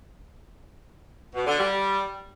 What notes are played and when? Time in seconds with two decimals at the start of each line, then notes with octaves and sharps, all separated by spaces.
1.35 B2
1.47 D3
1.59 G3